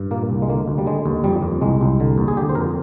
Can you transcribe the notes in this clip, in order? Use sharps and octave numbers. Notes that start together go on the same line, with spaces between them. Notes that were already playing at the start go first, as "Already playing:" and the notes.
Already playing: G2
A#2 A#3
C2
G#3
D3 A#3
D2
G3
D3 G#3
D#2
F2 G3
F2
C2 G#3
C2
D3
D#2
G#4
D3 G4
C5
F2 A#4